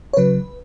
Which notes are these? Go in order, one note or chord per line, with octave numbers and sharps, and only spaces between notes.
C#5
C#3 F#3 B4